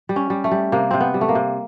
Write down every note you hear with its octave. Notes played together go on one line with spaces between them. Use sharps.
G3
C#4
G3
A3
G3
C3 A#3
C3 C4
B3
G3
A3
A#3
C3